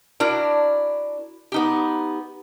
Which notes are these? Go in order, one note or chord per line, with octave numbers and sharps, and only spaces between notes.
D4 E4 F#4 A#4
B3 D#4 G4